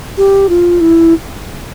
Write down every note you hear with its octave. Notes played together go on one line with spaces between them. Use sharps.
G4
F4
E4